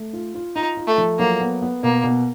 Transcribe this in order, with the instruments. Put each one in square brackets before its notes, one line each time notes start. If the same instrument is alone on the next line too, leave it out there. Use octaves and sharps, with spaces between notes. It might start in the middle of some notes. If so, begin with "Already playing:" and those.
Already playing: [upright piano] A3
F4
F4
[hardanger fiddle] D#4 [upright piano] F4
[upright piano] F4
[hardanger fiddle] A3
[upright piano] F3
[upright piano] F#3 [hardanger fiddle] A#3
[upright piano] B3
B3
[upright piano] B2 [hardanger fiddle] A#3
[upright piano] B2